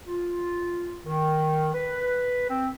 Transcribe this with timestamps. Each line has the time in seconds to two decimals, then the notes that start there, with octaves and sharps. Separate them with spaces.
0.07 F4
1.05 D#3
1.74 B4
2.49 C4